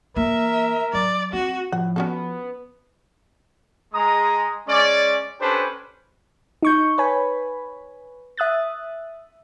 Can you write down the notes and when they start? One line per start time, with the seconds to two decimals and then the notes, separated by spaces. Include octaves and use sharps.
0.16 E3 A#3 A#4 E5
0.93 F#3 D5
1.33 C4 F#4
1.72 A2 F3 F#5
1.96 B3 C#4 F#4 A4
3.93 G#3 A#5 D#6
4.67 G#3 C#4 D5
5.40 C#4 D4 G4 A4 B4 C5
6.63 D#4 C#6 G6
6.98 B4 C#5 G#5 B5
8.37 E5 D#6 F#6 A6